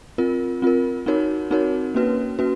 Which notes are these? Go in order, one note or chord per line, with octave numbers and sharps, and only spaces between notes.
C4 F4 A#4
C4 F4 A#4
C4 D#4 F#4 A#4 C#5
C4 D#4 F#4 A#4 C#5
A#3 C#4 F#4 B4
A#3 C#4 F#4 B4